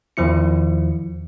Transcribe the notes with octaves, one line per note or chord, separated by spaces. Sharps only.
E2 D#3 F3 E4 C#7